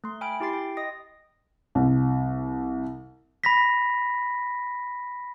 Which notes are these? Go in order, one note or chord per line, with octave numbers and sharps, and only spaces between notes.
A3 C6
G5 G#5 B5 F6 D7
E4 G4 C6 A6 C7
G5
D#5 D#6 A#6
C2
B5 A#6 B6